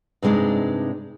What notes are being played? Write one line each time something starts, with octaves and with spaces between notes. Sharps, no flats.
G2 C3 G#3 D4 D#4